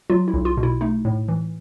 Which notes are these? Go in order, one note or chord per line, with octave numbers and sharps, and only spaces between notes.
F#3 F4
E4
B1
F4
B2
E4
A3 D#4
A2
E3